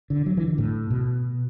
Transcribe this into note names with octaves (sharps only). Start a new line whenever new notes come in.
D3
F#3
E3
D3
A2
B2